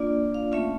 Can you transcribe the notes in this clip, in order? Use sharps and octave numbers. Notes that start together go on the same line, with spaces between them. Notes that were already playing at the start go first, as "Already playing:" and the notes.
Already playing: A#3 D4 F4 D5
F5
A3 C#4 F4 E5